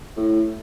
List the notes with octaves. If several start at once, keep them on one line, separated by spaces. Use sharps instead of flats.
A2